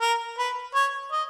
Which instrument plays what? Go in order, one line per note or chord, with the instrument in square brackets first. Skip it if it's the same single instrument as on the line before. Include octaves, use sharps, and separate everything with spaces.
[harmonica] A#4
B4
C#5
D#5